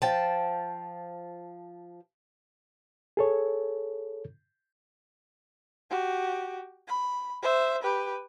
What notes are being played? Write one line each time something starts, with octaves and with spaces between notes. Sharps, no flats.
F3 G5 A5
G#4 A4 C#5
F#4 G4
B5
C5 E5
G4 B4